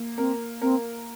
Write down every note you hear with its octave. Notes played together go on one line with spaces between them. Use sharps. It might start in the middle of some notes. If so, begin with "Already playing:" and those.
Already playing: A#3
C4 A#4
C4 A#4